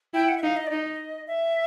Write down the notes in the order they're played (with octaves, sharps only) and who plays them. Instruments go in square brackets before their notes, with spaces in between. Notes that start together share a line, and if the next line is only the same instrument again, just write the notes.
[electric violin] E4 [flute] G5
[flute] F#5
E5
[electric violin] D#4 [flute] F5
[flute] D#5
D5
[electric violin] D#4 [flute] D#5
[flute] E5